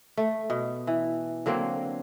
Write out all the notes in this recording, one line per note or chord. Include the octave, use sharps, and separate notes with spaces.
A3
B2
E3
D3 F#3 A#3 C4